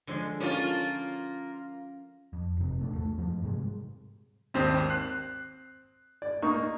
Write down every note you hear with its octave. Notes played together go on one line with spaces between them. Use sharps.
D3 F3 G#3
A#3 C#4 F4 A5
F2
F#1 C3
A#1 A3 D4
E2 A3
F#2 C#3 E3 F3
G#2 C3 G3 G#3
G#1 D#2 C4 C5
F#6 C7
D5
A#3 D#4 C#6